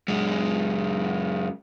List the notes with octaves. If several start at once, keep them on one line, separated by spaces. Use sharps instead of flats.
F#2 G#3